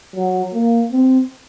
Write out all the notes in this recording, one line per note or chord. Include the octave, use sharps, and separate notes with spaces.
F#3
A#3
C4